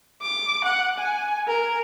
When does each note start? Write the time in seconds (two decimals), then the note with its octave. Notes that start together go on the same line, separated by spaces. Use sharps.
0.22 D6
0.64 F#5
0.98 G#5
1.47 A#4